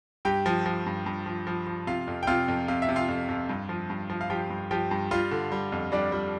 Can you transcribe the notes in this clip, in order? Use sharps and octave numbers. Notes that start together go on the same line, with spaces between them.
G2 G4 G5
F3
F3
G2
G2
F3
F3
F3
C3 F4 F5
F2
G5
C3 F4 F5
F2
C3 F5
E5
C3
F4 F5
F2
F2
G2
F3
G2
F3
F5
F3 G4 G5
G2
F3 G4 G5
G2
G3 F4 F5
D3
G3
F2
G3 D4 D5
G3